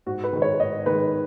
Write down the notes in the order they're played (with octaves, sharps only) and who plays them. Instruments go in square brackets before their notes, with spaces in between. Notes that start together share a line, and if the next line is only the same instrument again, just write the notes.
[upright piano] G#2 F#4
B4
D#3 G#3
C#5
G#2 D#5
D#3 G#3 B4